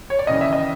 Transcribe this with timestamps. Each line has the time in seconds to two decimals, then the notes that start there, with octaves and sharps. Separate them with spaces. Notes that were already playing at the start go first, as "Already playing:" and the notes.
0.10 C#5
0.19 D5
0.27 D#2 C#3 E3 D#5
0.41 E5
0.53 D#5